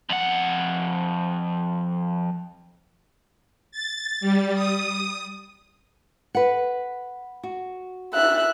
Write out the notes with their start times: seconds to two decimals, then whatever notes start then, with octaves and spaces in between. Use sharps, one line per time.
0.09 F2 F#5
3.72 A6
4.21 G3
4.54 D#6
6.35 B4 F#5
7.43 F#4
8.13 E5 F#6